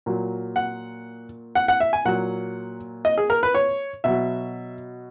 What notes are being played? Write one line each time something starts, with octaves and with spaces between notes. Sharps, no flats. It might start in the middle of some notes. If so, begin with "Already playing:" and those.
A#2 F#3
F#5
F#5
F#5
E5
G#5
A#2 F#3 F#5
D#5
G#4
A#4
B4
C#5
B2 F#3 E5